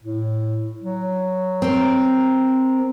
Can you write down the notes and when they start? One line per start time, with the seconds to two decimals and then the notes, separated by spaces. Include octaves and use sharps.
0.04 A2
0.82 F#3
1.62 C4 A#4